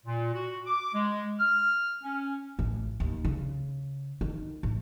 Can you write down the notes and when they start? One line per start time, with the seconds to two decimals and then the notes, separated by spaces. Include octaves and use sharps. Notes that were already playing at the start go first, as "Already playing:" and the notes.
0.05 A#2
0.33 F#4
0.67 D6
0.94 G#3
1.40 F6
2.03 C#4
2.59 A1
3.00 D#2
3.25 C#3
4.21 D#3
4.63 A1